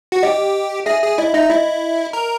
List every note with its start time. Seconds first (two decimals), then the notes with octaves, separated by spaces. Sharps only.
0.12 F#4
0.23 G4 D#5
0.86 G#4 E5
1.02 G#4
1.18 E4 D#5
1.34 D#4 E5
1.50 E4 D#5
2.13 A#4